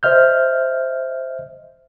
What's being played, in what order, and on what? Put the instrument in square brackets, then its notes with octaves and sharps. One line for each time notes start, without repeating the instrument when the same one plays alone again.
[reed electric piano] C5 D#5 E5 F6 G6